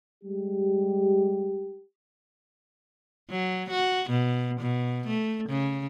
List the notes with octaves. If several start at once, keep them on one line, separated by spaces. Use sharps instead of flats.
G3 G#3 G4
F#3
F#4
B2
B2
A3
C#3